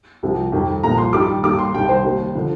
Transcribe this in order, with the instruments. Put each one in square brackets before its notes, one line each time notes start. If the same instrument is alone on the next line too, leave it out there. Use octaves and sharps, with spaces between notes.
[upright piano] C2 C3 F3
F2 D#3 G3
C2 A#2 F3 A#5
C6
G2 D#3 G3 D6
D#2 D#3 G3 D6
C6
C2 C3 D#3 G3 G5
C5
D#2 D#3 G3
D3 F3